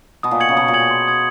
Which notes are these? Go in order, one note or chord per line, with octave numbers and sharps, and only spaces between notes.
B2 D#6
A#2
B2 G#6 C#7 F#7
C#3
B2 D#6
A#2
G#6 C#7 F#7
B2
C6
D#6 G#6